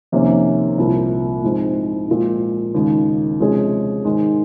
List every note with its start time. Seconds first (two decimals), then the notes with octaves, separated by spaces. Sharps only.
0.12 F2 C3 D#3 A#3 C#4
0.78 C2 A#2 F3
1.43 G#2 F3 G#3 C4
2.08 A#2 F3 G#3
2.75 D#2 C#3 G#3 D#4
3.40 C3 F3 G#3 C#4 G#4
4.05 G#2 D#3 G#3